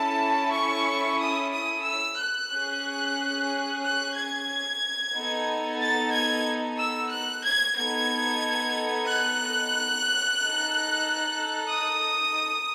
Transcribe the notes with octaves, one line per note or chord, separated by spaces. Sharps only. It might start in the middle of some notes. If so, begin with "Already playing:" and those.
Already playing: C#4 E4 A4 A5
C#6
D#6
D#6
E6
F#6
C#4 G#4
F#6
G#6
B3 D#4 A4
A6
G#6
E6
F#6
G#6
B3 D#4 A4 G#6
F#6
D#4 A4
D#6